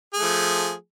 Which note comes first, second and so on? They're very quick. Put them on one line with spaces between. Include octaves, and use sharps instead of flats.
G#4 A3 F3